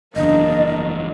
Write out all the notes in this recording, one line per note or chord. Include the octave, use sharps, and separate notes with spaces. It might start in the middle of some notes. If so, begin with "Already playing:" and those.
F#1 E2 A#3 D4 D#5